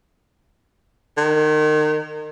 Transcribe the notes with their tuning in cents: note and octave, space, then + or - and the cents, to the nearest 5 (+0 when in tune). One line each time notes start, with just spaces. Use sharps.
D#3 -30